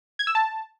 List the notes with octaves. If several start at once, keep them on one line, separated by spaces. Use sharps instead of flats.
G#6
E6
A5